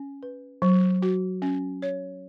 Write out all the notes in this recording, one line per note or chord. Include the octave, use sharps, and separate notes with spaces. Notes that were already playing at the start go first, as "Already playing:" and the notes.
Already playing: C#4
B4
F#3
F#4
C#4
C#5